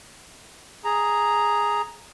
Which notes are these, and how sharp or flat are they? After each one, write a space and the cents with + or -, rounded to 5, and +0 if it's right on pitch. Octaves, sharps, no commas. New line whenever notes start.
G#4 +0 A#5 +0